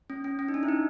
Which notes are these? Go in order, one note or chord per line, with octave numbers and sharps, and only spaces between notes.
C#4
C#4
C#4
D#4
D4
E4
D#4